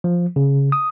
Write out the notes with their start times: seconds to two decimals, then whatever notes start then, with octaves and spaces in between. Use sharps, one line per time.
0.04 F3
0.36 C#3
0.72 D#6